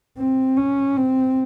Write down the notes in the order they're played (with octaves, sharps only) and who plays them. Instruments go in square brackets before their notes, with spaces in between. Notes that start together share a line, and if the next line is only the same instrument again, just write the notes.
[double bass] C4
C#4
C4